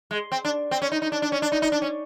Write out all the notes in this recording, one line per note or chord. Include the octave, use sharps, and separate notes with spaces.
G#3
C4
D4
C4
C#4
D#4
D#4
D4
D4
C#4
D4
D#4
D#4
D4
C#4